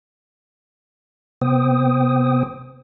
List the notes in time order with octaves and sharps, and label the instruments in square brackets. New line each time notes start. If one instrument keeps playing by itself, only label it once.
[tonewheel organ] C3 B3 C5 G5 D#6